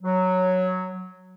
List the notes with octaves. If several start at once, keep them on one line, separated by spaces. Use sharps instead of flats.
F#3